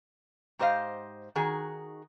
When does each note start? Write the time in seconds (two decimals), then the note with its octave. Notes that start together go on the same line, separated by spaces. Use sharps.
0.59 G#2 G4 C5 D#5 F5
1.35 D#3 D#4 F#4 G#4